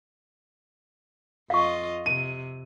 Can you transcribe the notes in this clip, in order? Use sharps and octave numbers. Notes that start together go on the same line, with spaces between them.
F2 F4 D#5 F5 C#6
C3 D#7